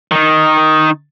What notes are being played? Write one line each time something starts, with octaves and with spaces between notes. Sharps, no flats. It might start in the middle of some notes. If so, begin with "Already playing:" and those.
D#3 D#4